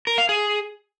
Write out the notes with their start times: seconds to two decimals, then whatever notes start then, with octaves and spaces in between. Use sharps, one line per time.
0.07 A#4
0.18 F5
0.29 G#4